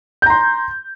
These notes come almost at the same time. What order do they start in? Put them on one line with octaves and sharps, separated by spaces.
G6 A#5 C6